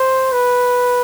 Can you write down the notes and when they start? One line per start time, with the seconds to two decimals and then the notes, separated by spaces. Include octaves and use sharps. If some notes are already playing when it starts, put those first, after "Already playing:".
Already playing: C5
0.32 B4